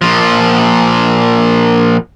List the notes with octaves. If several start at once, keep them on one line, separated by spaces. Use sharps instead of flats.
A#2 F3